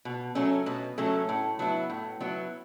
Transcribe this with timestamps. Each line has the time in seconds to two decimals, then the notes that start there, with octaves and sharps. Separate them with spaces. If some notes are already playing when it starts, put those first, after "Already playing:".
0.05 B2
0.35 F#3 A3 C#4
0.66 B2
0.98 F#3 A3 C#4
1.29 A2
1.59 F#3 B3 E4
1.90 A2
2.20 F#3 B3 E4